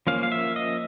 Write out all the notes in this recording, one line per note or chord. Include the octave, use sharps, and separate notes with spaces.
F3 A#3 C#4 F5
F5
E5
D#5